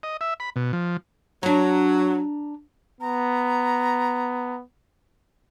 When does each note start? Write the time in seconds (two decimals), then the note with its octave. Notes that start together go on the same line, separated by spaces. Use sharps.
0.03 D#5
0.21 E5
0.40 B5
0.56 B2
0.73 F3
1.43 F#3 D4 A#5
3.01 B3 A#5